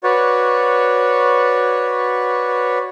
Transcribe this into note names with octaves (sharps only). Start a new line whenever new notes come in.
F#4 B4 C#5 D5